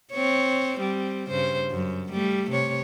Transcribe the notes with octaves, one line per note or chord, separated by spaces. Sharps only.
C4 C#5
G3 C4
G2 C#3 C5
F#2
G3 A3
C3 C#5